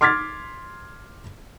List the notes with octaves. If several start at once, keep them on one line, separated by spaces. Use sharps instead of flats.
C6 D6 F6 G#6 A6 B6